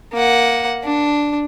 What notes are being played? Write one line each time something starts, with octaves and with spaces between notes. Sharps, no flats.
A#3 F#5
D4